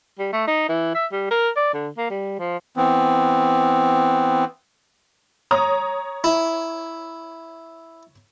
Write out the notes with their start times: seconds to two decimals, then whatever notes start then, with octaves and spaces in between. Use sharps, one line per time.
0.19 G3
0.33 A3
0.47 D#4
0.69 E3
0.95 E5
1.12 G3
1.31 A#4
1.56 D5
1.74 D3
1.97 A#3
2.10 G3
2.39 F3
2.77 E3 B3 C4
5.51 C#5 A#5 D#6
6.24 E4